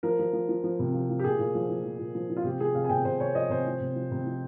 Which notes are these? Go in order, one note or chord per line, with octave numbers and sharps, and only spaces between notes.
F3 A#4
F3
F3
F3
F3
C3
F3
F3
G4
A#2 G#4
A#2
F3
F3
F3
A#2
F3
F3
F4
C3 G4
F3 G#4
C3 F5
G#5
C3 G5
C3 C5
C3 C#5
F3 D#5
C3 C5
F3
C3
F3
C3
F3